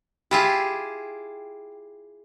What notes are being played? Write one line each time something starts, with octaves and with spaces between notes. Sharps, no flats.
E4 F4 G4 G#4